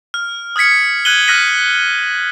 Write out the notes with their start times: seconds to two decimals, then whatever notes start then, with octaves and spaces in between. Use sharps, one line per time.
0.14 F6
0.56 D#6 F6 G#6 B6 C#7
1.05 F#6 G#6 D#7 F#7 G7
1.28 D#6 F6 F#6 A#6 B6 D#7